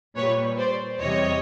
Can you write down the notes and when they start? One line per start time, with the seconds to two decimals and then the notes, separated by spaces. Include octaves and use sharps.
0.16 A#2 G3 B4 C#5
0.57 C5 D5
0.99 E2 C3 E3 G3 C#5 D#5